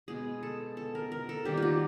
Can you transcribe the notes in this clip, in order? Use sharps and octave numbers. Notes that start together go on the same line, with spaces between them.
B2 G#3 B3 G#4
A4
A4
A#4
A#4
A4
D#3 G3 A#3 G4
F4 F#4